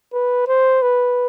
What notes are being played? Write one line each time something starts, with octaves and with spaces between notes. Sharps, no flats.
B4
C5
B4